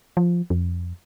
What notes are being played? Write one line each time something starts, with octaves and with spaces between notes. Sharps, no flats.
F3
F2